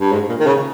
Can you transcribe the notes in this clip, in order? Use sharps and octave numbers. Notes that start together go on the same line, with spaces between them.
G2
G#2
A#2
D#3
C#3